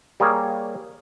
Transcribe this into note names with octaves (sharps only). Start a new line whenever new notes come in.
G3 A#3 G#4 C#5